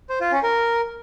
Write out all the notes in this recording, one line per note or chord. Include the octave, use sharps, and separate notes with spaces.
C5
F4
C#4
A#4